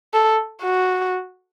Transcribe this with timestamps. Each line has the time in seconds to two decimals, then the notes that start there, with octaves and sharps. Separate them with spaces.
0.14 A4
0.63 F#4